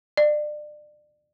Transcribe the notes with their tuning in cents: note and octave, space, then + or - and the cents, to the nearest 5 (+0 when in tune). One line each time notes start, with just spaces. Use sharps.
D5 +30